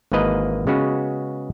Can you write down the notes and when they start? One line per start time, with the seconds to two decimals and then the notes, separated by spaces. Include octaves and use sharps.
0.12 G#1 G#2 E3 A#3 B4 D#5
0.67 C#3 G#3 B3 C#4 F#4 B4